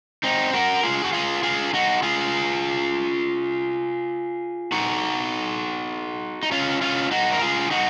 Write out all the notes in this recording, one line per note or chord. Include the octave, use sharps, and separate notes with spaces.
C4 D#4
F#4 A#4
F4 G#4
F#4
F4 G#4
F4 G#4
D#4 F#4
F4 G#4
D#4 F#4
D#4
C#4 F4
C#4 F4
D#4 F#4
A#4
F4 G#4
D#4 F#4